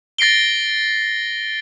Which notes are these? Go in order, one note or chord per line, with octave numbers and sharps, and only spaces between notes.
A6 A#6 C7 D7 G7